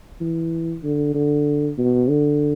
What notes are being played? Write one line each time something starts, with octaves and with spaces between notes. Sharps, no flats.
E3
D3
D3
B2
D3